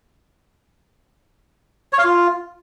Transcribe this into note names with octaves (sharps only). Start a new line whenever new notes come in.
C#5
F5
F4